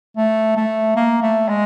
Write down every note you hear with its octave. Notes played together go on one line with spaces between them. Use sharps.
A3
A3
A#3
A3
G#3